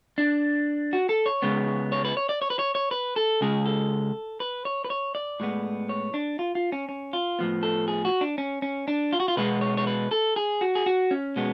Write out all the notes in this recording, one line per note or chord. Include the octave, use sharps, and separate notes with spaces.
D4
F#4
A4
C#5
C#2 C#3 G#3 B3
C#5
B4
C#5
D5
C#5
B4
C#5
C#5
B4
A4
C#2 C#3 G#3 G#4
A4
B4
C#5
B4
C#5
D5
A2 G#3 B3
C#5
D4
F4
F4
C#4
C#4
F4
A2 F3 B3
A4
G#4
F#4
D4
C#4
C#4
D4
F4
F#4
F4
B2 G#3 B3 B4
C#5
C#5
B4
A4
G#4
F#4
G#4
F#4
C#4
B2 G#3 B3